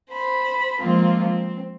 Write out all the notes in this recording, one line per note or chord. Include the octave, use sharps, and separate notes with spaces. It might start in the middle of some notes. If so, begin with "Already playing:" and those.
C5 B5
F3 G#3 A#3 C4 F4
C4